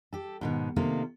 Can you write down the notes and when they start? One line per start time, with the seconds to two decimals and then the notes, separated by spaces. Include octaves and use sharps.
0.13 G4 A4
0.41 G#2 B2 D#3
0.76 C3 D#3 A3 A#3 F4